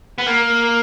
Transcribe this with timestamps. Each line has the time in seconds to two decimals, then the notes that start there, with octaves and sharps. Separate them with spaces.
0.18 B3
0.26 A#3